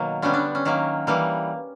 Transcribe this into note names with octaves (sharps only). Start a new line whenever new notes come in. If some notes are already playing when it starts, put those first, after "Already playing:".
Already playing: B2 D#3 F#3 A#3
D3 G3 B3 C#4
D4
C#4
D#3 F#3 A#3
E3 G3 A#3